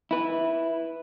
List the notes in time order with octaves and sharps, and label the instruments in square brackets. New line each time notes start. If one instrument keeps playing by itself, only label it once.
[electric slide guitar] E4 B4